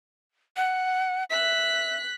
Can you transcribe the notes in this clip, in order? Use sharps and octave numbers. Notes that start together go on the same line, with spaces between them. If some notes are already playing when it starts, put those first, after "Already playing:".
F#5
E5 F#6 B6